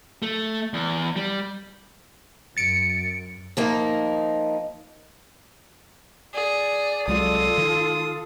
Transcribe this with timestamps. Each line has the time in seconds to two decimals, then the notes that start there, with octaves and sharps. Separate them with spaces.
0.22 A3
0.74 E2
1.16 G3
2.57 F#2 A6 C#7 D7
3.57 F3 A#3 D#4
6.34 G#4 D5
7.08 C2 F#3 G#3 F4 A4 D#6
7.58 D#3